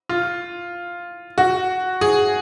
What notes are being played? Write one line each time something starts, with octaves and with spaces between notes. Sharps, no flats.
F4
F#4
G#4